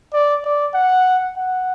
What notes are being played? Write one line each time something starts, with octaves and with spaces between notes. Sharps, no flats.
D5
D5
F#5
F#5